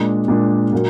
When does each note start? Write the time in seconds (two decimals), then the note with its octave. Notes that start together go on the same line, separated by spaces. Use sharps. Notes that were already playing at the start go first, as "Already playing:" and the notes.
Already playing: A#2 G#3 D4
0.28 A#2 G#3 D4
0.72 A#2 F#3 A#3